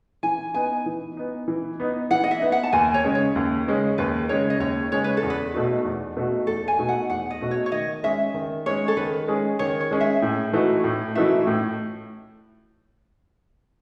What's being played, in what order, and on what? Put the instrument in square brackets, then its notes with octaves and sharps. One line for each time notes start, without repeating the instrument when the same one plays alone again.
[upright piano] E3 [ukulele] G#5
[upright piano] B3 D#4 [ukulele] G#5
[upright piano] E3
B3 D#4
E3
B3 D#4
[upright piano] E3 [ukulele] F#5
[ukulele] D#5
E5
[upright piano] B3 D#4
[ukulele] F#5
A5
[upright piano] D#2 [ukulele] G#5
[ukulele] C#5
[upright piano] C#3 G#3 C#4
[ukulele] C#5
[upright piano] D#2
C#3 G#3 C#4
[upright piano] D#2 [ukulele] B4
[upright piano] C#3 G#3 C#4 [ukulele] C#5
[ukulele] D#5
[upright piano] D#2 [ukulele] C#5
[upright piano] C#3 G#3 C#4 [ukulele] C#5
[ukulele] B4
A4
[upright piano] E2
[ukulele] B4
[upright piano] B2 A3 D#4 F#4
E2
B2 A3 D#4 F#4
[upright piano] E2 [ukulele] A4
[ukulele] G#5
[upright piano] B2 A3 D#4 F#4
[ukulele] F#5
[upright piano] E2 [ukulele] F#5
[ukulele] D#5
[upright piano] B2 A3 D#4 F#4
[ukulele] C#5
C#5
[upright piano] D#3 [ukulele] D#5
[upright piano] G#3 C#4 G#4 [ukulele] E5
[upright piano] D#3
[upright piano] G#3 C#4 G#4 [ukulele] C#5
[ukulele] A4
[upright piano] D#3 [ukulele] B4
[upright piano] G#3 C#4 G#4
[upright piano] D#3 [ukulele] C#5
[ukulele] C#5
[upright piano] G#3 C#4 G#4
[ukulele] E5
[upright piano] A2
E3 A3 D#4 F#4
A2
[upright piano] E3 A3 D#4 F#4 [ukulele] E5
[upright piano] A2